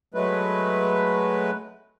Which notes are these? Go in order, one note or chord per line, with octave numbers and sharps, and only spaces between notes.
F#3 G#3 A3 B4